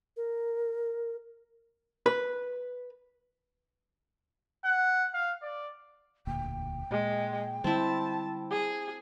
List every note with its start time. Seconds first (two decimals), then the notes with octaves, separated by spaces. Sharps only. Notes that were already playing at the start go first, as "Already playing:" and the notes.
0.17 A#4
2.06 B4
4.65 F#5
5.14 F5
5.43 D5
6.27 E1 D2 A#2 G5
6.91 A#2 G#3
7.64 D3 G3 C4 E4 A5
8.51 G#4